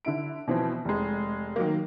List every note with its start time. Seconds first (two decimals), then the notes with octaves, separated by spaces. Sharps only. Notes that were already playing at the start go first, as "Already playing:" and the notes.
0.05 D3 E4 D7
0.47 B2 E3 F3 C4
0.85 F1 G#3
1.56 D#3 F#3 A#3